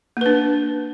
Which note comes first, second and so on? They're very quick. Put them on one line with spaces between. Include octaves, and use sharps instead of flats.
A#3 B4 D4